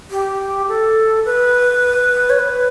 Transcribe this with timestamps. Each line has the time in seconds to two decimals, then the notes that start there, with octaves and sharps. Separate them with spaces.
0.11 G4
0.68 A4
1.25 B4
2.30 C#5
2.39 B4